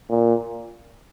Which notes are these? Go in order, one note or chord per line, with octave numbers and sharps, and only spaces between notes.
A#2